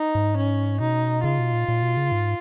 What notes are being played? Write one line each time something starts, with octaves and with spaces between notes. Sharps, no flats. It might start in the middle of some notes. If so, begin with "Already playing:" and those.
Already playing: D#4
G#2
C#4
B2 D#4
C#3 F4
B2
A#2
A#2
B2
C#3
G#2